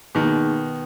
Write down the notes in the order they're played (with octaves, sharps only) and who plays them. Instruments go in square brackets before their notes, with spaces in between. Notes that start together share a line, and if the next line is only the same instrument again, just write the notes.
[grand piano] B2 D#3 [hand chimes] A#3 D#4 G#4